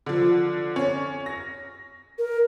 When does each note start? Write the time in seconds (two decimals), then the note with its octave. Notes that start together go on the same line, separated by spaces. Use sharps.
0.06 D3 F3
0.76 C#4
1.26 A#6
2.18 A#4